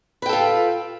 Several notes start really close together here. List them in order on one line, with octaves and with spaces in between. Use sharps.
B4 G5 A4 F4